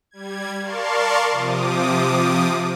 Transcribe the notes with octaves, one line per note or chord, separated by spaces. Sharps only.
G3 G#6
A#4 D5 F5 A5 C6 C#6
C3 F3 D6 D#6